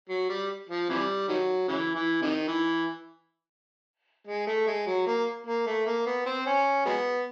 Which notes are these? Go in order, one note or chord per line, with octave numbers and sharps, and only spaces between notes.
F#3
G3
F3
C3 E3 G3
D#3 F#3
C#3 E3
E3
C3 D#3
E3
G#3
A3
G#3
F#3
A#3
A#3
A3
A#3
B3
C4
C#4
F#3 G#3 B3